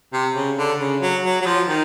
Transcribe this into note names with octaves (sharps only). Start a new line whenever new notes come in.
C3
C#3
D3
C#3
F#3
F#3
F#3
F3
D#3